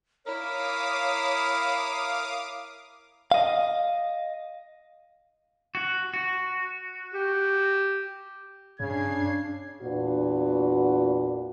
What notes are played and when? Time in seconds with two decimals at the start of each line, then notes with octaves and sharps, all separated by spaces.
0.26 E4 A#4 C#5 F5 D6 D#6
3.32 D#5 F5
5.75 F#4
6.14 F#4
7.14 G4
8.80 G2 C#3 D4 G#6 C7
9.82 E2 A#2 D4 F#4 B4